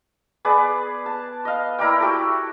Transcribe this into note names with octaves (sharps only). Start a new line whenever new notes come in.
B3 G#4 B4 D5
A5
D#5 F5
E4 A#4 D5 G5
F#4 G4 A4